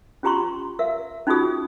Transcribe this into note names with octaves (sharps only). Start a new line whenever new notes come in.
C#4 F4 G4 A#5 C6 C#6
A#4 E5 F5
C#4 D#4 F4 F#4 G#4 D#6